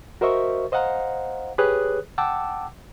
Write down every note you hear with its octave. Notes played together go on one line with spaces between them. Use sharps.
F#4 A#4 C5 D#5 E5 C#6
C5 D#5 F5 F#5 A#5
G4 G#4 B4 C#5 D#6 F#6
F#5 G5 A5 D6 E6